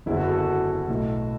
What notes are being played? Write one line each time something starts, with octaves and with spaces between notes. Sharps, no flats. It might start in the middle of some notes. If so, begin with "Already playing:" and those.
F#1 E2 D3 E4
F#4
A4
F#4
B1 A2 E3 A3